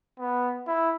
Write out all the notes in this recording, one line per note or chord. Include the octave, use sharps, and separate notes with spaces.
B3
E4